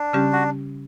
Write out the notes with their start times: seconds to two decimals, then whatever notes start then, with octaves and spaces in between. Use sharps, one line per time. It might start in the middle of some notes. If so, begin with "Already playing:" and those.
Already playing: D4
0.13 C#3 G3 C#4 G4
0.33 F#4